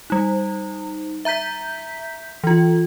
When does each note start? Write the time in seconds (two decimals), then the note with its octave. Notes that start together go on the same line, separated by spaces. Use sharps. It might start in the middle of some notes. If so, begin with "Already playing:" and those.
0.10 G3 D#4
1.25 E5 A#5 G6 B6
2.44 E3 F4